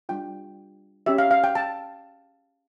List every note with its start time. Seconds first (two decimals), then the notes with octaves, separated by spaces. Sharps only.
0.09 G3 D4 F4 G5
1.06 C#4 G4 E5
1.18 F5
1.31 F5
1.44 G5
1.55 A5